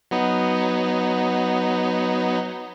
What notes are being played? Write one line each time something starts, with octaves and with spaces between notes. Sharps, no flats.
F#3 B3 D#4